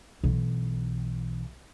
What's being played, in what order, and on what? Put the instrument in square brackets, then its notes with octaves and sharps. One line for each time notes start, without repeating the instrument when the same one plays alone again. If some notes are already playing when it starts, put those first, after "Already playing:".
[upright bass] B1 E3